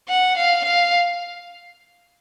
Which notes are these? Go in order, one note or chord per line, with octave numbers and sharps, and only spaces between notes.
F#5
F5
F5